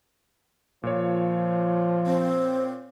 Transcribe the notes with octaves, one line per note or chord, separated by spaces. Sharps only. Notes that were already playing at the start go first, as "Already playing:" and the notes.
A#2 F3 C#5
C4